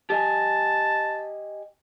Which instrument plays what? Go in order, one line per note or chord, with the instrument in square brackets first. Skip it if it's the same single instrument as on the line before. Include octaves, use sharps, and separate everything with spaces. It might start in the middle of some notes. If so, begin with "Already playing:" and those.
[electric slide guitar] G4 D#5 G#5 [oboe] A5